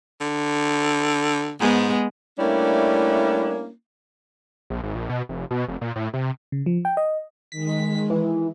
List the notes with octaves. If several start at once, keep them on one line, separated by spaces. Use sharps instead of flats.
D3
G#2 G#3 B3
G3 A3 A#3 C#4 D4 E4
A#1
G#1
A#1
B2
F1
B2
F1
A#2
A2
C3
C#3
F3
G5
D#5
D#3 G#3 B6
E3